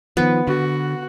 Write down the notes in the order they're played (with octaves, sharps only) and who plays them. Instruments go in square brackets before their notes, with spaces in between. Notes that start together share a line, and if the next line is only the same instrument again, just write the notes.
[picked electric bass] D#3 F3 [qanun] B3
[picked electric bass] D3 [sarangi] F#4